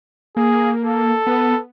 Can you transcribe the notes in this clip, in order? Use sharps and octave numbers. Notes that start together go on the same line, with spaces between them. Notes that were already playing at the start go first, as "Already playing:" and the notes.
A#3 G#4
A4
B3